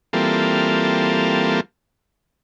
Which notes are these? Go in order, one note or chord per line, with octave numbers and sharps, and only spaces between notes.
E3 G3 A#3 C4 F4 A4